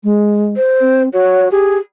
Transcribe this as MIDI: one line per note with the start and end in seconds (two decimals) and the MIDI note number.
0.04 0.55 56
0.56 1.03 72
0.81 1.09 60
1.13 1.49 66
1.13 1.48 73
1.51 1.78 67
1.51 1.76 68